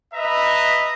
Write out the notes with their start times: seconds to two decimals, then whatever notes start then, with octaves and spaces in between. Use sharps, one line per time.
0.14 B4 D#5 E5 A#5